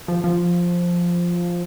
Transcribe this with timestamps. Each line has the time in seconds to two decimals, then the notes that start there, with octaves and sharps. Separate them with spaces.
0.08 F3
0.24 F3